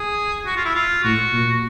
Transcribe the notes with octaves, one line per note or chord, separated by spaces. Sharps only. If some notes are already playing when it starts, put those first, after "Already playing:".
Already playing: G#4
F#4
F4
E4
F4
A2 F#4
A#2